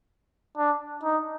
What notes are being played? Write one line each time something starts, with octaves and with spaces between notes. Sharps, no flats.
D4
D#4